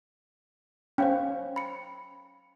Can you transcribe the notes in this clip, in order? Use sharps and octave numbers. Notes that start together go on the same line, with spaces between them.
C#4 C5 F5 G5
B5 C#7